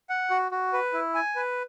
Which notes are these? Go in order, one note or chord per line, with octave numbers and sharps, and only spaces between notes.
F#5
F#4
F#4
B4
E4
G#5
B4